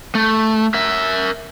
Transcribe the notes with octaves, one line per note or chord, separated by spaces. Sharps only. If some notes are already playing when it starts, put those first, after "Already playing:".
A3
A#4 E5